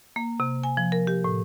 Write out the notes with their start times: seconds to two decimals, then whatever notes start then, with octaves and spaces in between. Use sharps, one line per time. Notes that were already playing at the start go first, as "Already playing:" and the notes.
0.16 A#3
0.40 C3
0.63 G#5
0.77 F3
0.92 A#4
1.07 G4
1.24 A2